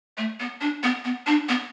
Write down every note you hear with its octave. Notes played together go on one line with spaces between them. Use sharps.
A3
B3
D4
B3
B3
D4
B3